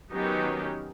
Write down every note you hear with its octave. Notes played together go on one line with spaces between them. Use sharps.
D#3 F#3 B3 C#4 D#4 G4